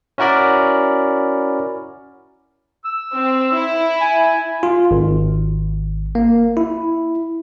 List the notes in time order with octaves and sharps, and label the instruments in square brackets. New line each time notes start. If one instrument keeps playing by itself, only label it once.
[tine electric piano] C#4 E4 F#4 A#4 D5 B5
[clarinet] E6
[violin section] C4
E4
[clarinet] G#5
[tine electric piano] F4
G#1
A#3
E4